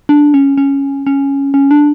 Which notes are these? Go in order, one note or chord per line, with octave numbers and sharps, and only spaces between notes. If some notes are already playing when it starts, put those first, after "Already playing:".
D4
C#4
C#4
C#4
C#4
D4